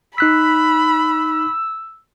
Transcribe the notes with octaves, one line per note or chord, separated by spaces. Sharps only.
D#4 B5 E6 F#6 B6